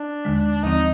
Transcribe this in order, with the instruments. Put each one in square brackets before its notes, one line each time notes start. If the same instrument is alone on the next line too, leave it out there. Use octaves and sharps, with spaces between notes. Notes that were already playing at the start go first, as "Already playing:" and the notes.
Already playing: [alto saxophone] D4
[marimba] D#2 D3 G#3
[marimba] D#2 D3 F3 C4 [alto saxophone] D#4